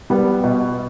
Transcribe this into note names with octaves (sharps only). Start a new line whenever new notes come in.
G3 B3
B2